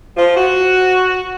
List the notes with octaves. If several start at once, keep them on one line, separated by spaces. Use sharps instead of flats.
F3
F#4